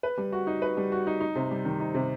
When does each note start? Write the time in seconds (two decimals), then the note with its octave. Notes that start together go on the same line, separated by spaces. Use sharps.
0.03 B4
0.18 G3
0.32 F#4
0.47 D#4
0.62 B4
0.77 G3
0.92 F#4
1.07 D#4
1.21 D#4
1.36 C3
1.51 G3
1.65 D#3
1.80 D#4
1.94 C3